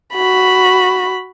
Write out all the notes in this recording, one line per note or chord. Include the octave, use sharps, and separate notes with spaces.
F#4 B5